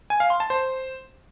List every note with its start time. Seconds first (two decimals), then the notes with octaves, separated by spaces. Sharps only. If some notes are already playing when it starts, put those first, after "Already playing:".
0.10 G#5
0.20 F5
0.30 C6
0.40 A5
0.50 C5